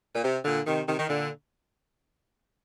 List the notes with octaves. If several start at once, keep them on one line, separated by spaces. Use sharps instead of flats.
A#2
C3
A#2 D3
C3 D#3
C3 D#3
D#3
A#2 D3